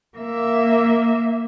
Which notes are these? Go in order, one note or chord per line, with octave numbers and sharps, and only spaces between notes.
A#3 E5